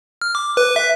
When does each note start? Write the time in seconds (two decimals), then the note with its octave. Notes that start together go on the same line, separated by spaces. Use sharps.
0.22 F6
0.35 D6
0.57 B4
0.76 E5